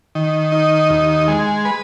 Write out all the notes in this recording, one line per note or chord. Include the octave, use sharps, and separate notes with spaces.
D#3
D#4
D#2
G#3
B4